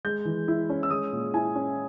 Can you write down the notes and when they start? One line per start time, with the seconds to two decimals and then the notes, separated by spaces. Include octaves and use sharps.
0.05 G#3 G6
0.25 E3
0.48 E4
0.69 C#4
0.83 E6
0.90 G#3 D#6
1.12 A#2
1.34 E4 G#5
1.55 C#4